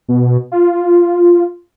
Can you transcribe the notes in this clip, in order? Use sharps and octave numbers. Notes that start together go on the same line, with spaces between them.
B2
F4